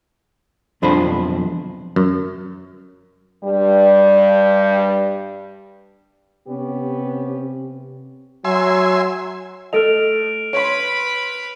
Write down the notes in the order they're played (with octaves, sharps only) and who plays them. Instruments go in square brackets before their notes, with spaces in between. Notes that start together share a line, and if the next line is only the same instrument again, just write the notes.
[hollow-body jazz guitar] B1 F2 F3 D4 C5 B5
[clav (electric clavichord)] F#2
[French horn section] G2 G3
[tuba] C3 [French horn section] B3 C#4 G4
[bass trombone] F#3 [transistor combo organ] E5 G#5 C6
[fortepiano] A3 A4 D#5 [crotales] F6 D7 F7
[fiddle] B4 B5 [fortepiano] C#5 C6 [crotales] D7